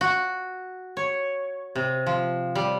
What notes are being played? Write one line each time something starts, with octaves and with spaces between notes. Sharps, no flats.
F#4
C#5
C3
F3
G3